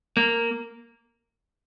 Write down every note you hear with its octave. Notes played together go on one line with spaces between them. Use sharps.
A#3